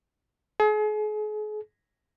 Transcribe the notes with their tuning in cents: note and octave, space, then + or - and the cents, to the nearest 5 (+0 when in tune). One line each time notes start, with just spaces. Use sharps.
G#4 +40